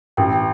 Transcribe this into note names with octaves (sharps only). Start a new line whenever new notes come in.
A1 G5
G5